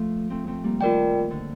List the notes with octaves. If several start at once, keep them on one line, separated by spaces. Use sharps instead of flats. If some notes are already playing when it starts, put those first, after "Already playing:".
Already playing: F3 A3
A3 C4
A3 C4
G3 A#3
D#3 F4 A#4 D5 G5
D3